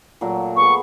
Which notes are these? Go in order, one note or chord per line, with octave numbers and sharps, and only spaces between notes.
A#2 F#3 A3
B3 G#4 C#6